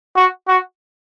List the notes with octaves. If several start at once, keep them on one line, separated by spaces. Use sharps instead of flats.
F#4
F#4